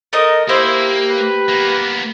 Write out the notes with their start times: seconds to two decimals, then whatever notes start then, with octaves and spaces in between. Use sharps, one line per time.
0.13 A3 A#4 D#5
0.49 A#3 E4 G4 C5
1.10 B4
1.48 A#3 B3